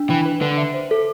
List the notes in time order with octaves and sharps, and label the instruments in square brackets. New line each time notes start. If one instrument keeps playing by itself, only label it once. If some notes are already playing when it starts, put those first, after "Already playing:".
Already playing: [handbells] D4
[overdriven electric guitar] E3 [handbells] G5
[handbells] B4
[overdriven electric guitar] D3 [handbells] B4
[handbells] E5
C5
A4